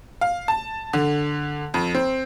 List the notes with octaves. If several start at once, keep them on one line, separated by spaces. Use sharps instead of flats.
F5
A5
D3
F2
C4